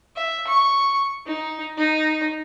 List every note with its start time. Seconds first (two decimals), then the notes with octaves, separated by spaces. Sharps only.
0.17 E5
0.48 C#6
1.27 D#4
1.78 D#4